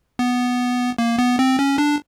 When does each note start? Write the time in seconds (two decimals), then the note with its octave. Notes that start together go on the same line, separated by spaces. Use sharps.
0.19 B3
0.98 A#3
1.18 B3
1.39 C4
1.59 C#4
1.78 D4